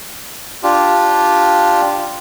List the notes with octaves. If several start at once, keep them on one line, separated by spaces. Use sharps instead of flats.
D4 F4 G4